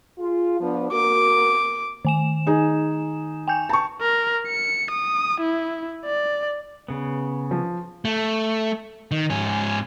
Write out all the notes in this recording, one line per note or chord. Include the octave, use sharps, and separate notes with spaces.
F4 G#4
F3 B3 D4
A#3 F#4 A#4 D6
D#3 G#5 E7
D#4 G#4
G5 G#5 G6
A5 C#6
A#4
C#7
D#6
E4
D5
C#3 B3
F3
A3
D#3
G#2 C#4